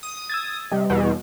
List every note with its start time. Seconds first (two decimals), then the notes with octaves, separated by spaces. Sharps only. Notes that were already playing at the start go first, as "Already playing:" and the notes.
0.03 D#6
0.30 E6 G#6 A6
0.71 C3 G3 G4 D#5
0.90 E2 B2